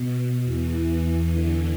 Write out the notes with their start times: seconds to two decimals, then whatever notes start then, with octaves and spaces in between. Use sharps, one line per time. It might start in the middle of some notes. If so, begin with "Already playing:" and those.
Already playing: B2
0.14 B2
0.44 E2 E3
1.03 E2 E3
1.31 D3